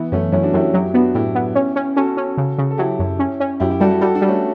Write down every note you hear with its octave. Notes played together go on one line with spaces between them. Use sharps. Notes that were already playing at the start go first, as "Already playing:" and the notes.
Already playing: E3 B3
F#2 A3 C#4
F#2 C#4 E4
D4 F#4
F#2 E4 G4
F#3 E4 G4
B3 D4 F#4
A2 E4 G4
B3
C#4
C#4
C#4 F#4 A4
C#4
C#3
C#3
A4
F#3 E4 G4
F#2
C#4
C#4
F#2 E4 G4
E4 G4
G3 F#4 A4
E4 G4
G3 F#4 A4
D4 F#4
G3
A3 C#4